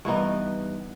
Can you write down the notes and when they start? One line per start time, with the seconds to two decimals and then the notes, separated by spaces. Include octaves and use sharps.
0.05 G2 E3 B3 D#4